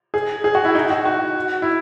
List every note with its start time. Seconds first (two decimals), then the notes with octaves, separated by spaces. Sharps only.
0.14 G#4
0.44 G#4
0.55 F#4
0.65 E4
0.75 D#4
0.90 F#4
1.05 F#4
1.62 E4